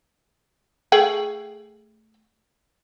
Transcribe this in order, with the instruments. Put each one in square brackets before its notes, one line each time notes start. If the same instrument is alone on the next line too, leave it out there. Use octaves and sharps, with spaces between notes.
[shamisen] A3 G#4 G5